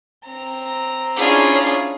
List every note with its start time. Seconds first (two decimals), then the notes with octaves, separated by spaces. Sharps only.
0.26 C4 A#5
1.16 C#4 D4 E4 F4 G#4